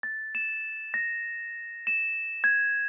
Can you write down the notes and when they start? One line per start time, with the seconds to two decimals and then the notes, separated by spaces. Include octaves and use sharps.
0.03 A6
0.35 E7
0.94 A#6
1.87 E7
2.44 G#6